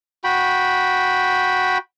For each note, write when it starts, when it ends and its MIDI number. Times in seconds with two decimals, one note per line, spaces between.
0.24 1.78 66
0.24 1.78 79
0.24 1.78 83